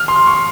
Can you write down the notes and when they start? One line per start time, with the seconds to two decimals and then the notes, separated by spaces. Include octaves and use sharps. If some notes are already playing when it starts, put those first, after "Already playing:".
Already playing: F6
0.08 C6
0.27 C#6